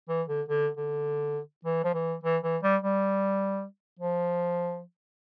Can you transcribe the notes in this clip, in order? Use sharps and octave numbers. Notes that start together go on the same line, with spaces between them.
E3
D3
D3
D3
E3
F3
E3
E3
E3
G3
G3
F3